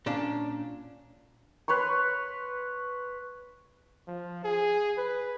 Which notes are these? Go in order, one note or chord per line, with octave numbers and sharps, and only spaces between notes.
A#2 C#4 D4
B4 C#5 C6 C#6
F3
G#4
B4